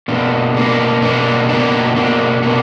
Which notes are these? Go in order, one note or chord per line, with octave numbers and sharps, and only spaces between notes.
B2 A#3 D4
B2 A#3 D4
B2 A#3 D4
B2 A#3 D4
B2 A#3 D4
B2 A#3 D4